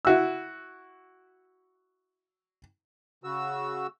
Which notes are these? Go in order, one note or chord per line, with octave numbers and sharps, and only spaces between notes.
E4 F#4 E6
C#3 F#4 E6